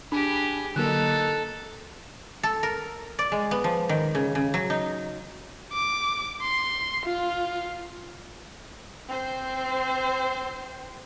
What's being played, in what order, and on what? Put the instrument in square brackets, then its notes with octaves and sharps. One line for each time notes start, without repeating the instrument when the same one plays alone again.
[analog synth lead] D4 [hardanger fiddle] G4 G#4 [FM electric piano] B5
[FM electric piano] D3 F#3 A#3 [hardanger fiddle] D#4 A4 [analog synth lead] F#6
[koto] A4
A#4
D5
G#3
B3
F3
D#3
C#3
C#3
F#3
D#4
[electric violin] D6
C6
F4
[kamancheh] C4 C5